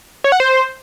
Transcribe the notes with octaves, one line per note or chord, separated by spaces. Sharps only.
C#5
F#5
C5